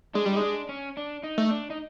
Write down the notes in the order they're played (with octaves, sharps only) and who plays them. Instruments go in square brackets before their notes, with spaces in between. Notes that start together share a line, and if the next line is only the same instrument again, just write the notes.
[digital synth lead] G#3 [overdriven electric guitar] D4
[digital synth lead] G3
[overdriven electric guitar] D#4
[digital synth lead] G#3
[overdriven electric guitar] D4
C#4
D4
D#4
[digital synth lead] A3
[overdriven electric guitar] D4
D#4